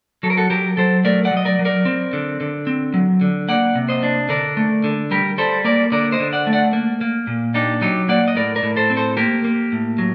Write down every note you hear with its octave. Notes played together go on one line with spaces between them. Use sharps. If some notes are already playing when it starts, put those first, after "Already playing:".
F#3 A4
A#4
F#4 A4
F#3 G4 A#4
F#3 A4 C5
A3 A#4 D5
D5 F#5
F#3
D#5
A#4 D5
F#3
A#4 D5
C4
D3
D3
C4
F#3
D3
A#3 D5 F#5
C3
C5 D#5
D4
D3 A#4 D5
A3
D3
G3 G4 A#4
G3 A4 C5
A#3 A#4 D5
D3 A#4 D5
C5 D#5
D3
D5 F#5
A3
D5 F#5
A#3
A#3
A#2
D4 D#4 G4
F#3 D#4 G4
A#3 D5 F#5
D#5
A2 A#4 D5
A#4 D5
A2
A4 C5
C4
A4 C5
A#3 G4 A#4
A#3
A2
F#3